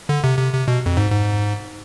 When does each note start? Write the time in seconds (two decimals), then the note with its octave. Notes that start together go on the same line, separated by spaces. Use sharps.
0.09 D3
0.24 C3
0.38 C3
0.53 C3
0.68 B2
0.86 F2
0.97 G#2
1.12 G#2